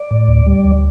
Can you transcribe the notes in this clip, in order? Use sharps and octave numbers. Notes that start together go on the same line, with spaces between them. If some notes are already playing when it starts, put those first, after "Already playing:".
Already playing: D5
A2
D2
G3
D2